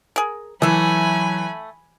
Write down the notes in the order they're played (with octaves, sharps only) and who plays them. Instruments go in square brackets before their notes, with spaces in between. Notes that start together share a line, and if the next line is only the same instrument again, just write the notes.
[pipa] G#4 A#4
[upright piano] E3 [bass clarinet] F#3 [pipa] A3 E5 [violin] G#5 B5